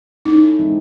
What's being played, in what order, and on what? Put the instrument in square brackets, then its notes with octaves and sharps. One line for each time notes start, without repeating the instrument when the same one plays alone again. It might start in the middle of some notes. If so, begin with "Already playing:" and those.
[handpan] A3 C#4 E4 [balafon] D#4
[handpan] E3 G#3 C4 D#4